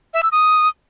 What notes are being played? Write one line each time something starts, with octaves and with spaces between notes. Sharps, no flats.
E5
E6
D#6